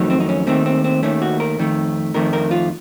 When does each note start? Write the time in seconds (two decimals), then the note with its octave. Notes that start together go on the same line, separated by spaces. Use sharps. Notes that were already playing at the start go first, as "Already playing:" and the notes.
Already playing: F2 D#3 F#3 A3
0.10 C4
0.20 D#4
0.29 C#4
0.47 D#2 D#3 A3 C4
0.66 C4
0.84 C4
1.03 D#2 D#3 A3 C#4
1.22 F#4
1.40 A#4
1.59 F2 D#3 A3
2.14 F2 D#3 A3 A#4
2.33 A#4
2.51 F4